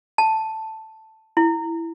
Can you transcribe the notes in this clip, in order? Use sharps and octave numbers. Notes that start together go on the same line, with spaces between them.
A5
E4